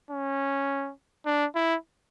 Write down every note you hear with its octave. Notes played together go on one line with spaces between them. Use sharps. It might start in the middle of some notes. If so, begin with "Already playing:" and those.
C#4
D4
E4